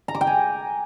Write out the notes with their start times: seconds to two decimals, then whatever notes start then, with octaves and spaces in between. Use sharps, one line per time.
0.08 A#5
0.15 D6
0.21 G5
0.27 G#5